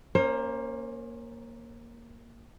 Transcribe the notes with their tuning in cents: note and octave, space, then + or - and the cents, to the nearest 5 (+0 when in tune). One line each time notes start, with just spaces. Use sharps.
A#3 +0 C#4 +0 C5 +35